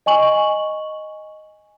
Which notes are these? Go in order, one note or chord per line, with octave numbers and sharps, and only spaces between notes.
D#5 G#5 C#6 F#7